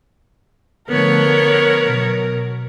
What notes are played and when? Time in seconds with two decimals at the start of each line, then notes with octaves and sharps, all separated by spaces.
0.89 D3 F3 A3 B3 A#4 C#5
1.85 B2 F#3